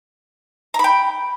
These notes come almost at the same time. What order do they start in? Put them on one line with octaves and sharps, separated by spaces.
A#5 B5 G5